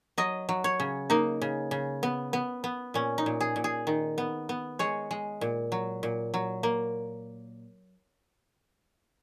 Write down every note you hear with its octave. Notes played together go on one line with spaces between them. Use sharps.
F#3 D#5
F#3
C#5
C#3
A#3 D#4
C#3
C#3
B3
B3
B3
A#2 C#4
D#4
A#2
G#4
A#2
G#4
D#3
B3
B3
G#3 C#5
G#3
A#2
F#3
A#2
F#3
A#3